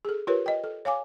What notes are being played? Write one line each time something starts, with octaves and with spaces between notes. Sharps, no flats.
G#4 A4
F4 G4 A#4 B4 C#5
D#5 G5
A4
C#5 F5 G#5 D6